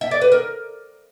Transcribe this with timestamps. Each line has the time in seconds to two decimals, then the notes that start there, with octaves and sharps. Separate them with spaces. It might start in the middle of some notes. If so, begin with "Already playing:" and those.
0.01 E5
0.11 D5
0.22 B4
0.32 A#4